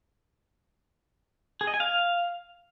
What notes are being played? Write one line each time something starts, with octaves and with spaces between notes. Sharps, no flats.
G#4
D#5
G#5
F5